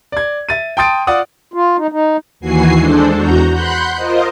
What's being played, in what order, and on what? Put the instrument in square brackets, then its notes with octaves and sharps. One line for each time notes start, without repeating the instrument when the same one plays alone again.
[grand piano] D5 G#6
E5 A6 D#7
G5 A5 C6 D#6 A6 D7
F4 D5 F#5 D#6
[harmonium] F4
D#4
D#4
[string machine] D#2 E3 F#4 G#5 C7
G#3 D4 A4 C5
E2 F#4 A#5 G6
F#5 B5 C6 F#6 G6
F4 A#4 C5 D#5